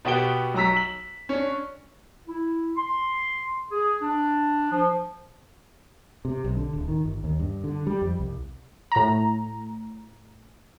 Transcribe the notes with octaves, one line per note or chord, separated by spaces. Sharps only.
B2 B3 F#4 G4 D7 G7
B1 F#3 A#5 E6 B6
F#7
C#4 D4
E4
C6
G#4
D4
F3
C3
B1
D3
D1
D#3
G1
D#2
G2
D3
G3
F2
C2
A2 A#5